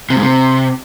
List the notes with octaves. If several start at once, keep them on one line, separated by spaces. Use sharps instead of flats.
C3
G#2
C3